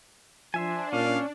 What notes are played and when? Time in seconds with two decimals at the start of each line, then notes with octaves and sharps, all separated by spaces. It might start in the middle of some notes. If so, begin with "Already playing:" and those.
0.54 F3 D4 C5 E5 G#5
0.93 A#2 C#4 F5